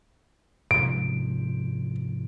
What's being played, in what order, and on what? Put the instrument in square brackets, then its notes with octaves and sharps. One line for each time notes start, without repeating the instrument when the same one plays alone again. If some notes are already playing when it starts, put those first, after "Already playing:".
[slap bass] G#2 C3 F3 [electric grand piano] D7